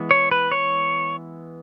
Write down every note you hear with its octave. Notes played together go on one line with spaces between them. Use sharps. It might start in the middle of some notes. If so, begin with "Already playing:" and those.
Already playing: E3 G#3 B3
C#5
B4
C#5